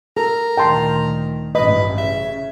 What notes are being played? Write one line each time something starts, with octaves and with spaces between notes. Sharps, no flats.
A4 A#4
D2 A#2 D#3 G5 A5 C6
A1 G2 B4 D#5
C#3 E5